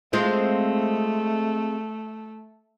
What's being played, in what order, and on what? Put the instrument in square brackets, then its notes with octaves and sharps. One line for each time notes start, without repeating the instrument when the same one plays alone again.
[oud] G#3 C4 F4 [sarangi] A3